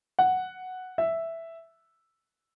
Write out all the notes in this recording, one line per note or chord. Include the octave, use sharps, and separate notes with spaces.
F#5
E5